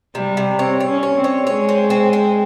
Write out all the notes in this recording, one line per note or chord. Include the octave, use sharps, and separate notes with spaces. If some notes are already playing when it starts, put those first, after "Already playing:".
C3 G3
C3
C4 C#5
C#5
C#4
C#5
C4
C#5
G#3 C#5
C4
C4
C4